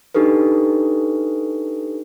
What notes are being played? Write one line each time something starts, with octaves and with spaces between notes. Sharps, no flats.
D4 D#4 G4 A4 B4